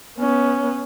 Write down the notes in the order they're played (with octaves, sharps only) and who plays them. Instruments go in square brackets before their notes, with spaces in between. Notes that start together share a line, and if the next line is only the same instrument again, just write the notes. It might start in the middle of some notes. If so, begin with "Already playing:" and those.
[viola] B3 C#4